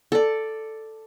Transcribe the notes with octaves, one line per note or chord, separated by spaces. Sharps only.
A4 D5